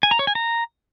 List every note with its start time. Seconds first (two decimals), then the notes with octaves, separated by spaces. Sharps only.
0.03 G#5
0.11 A#5
0.19 C#5
0.27 G#5
0.35 A#5